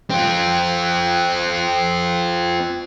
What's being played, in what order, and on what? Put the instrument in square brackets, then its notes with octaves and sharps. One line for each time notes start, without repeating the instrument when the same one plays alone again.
[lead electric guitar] C4 F4